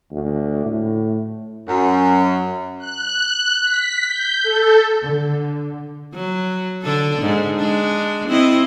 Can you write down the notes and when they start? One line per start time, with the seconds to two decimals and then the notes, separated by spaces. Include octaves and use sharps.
0.11 D2
0.65 A2
1.68 F#2
2.78 F#6
3.63 B6
4.05 G6
4.43 A4
5.02 D3
6.14 F#3
6.82 D3 D4 A4
7.22 G#2
7.59 G#3 D4
8.28 C4 E4 D#5